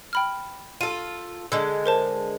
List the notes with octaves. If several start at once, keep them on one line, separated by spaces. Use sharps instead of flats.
G5 B5 F6
F4 A4 D#7
D3 G#3 E6
A#4 C5 A5